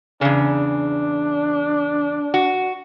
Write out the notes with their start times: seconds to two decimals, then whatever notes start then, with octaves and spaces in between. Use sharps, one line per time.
0.21 E2 C#3 D4
2.34 F#4